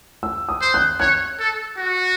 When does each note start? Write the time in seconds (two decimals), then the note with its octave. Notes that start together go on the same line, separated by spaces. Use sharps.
0.23 E6
0.49 D#6
0.61 C5
0.74 F#6
1.00 C#5 F#6
1.39 A4
1.77 F#4